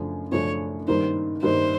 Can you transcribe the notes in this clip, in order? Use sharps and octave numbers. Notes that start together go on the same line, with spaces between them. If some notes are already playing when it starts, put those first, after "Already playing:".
Already playing: F#2 C#3 F3 A3 D4
F#2 C#3 F3 A3 D4 C#5
G2 D#3 G3 A#3 D#4 C5
G2 D#3 G3 A#3 D#4 C5